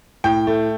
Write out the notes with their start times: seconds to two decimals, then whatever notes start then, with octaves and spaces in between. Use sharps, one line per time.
0.24 A2 G5
0.47 A3